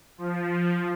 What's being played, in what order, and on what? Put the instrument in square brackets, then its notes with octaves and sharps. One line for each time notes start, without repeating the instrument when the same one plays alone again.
[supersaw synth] F3